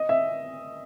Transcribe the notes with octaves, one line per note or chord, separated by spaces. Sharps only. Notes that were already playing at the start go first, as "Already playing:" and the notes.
Already playing: D#5
E5